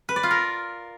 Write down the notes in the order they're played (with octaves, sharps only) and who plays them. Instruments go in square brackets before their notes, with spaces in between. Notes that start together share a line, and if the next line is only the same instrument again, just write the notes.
[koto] B4
D5
F4
A#4